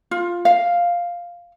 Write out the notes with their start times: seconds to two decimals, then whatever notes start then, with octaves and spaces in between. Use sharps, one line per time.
0.11 F4
0.45 F5